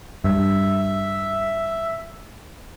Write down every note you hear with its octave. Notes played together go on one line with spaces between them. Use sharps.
G2 E5